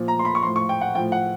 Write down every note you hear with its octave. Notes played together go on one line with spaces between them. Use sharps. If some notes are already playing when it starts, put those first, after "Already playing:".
Already playing: A#2 F3
A#5
C6
B5
C#6
A2 F3 C6
C#6
G5
F#5
A2 F3 G5
F#5